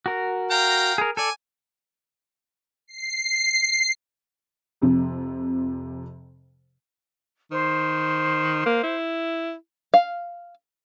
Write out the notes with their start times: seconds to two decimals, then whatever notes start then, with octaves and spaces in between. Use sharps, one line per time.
0.06 F#4 A#4
0.51 F5 G5 A#5
0.98 G#4 A#4
1.17 A4 D5 G#5
2.88 C7
4.81 F2 C3 F3
7.52 D#3 C5
8.66 A#3
8.84 E4
9.94 F5